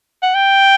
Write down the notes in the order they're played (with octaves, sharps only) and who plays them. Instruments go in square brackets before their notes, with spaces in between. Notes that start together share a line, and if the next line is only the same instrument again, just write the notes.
[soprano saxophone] F#5
G5